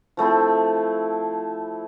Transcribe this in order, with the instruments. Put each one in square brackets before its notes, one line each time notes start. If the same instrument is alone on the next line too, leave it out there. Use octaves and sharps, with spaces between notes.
[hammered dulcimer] F3 A3 C4 E4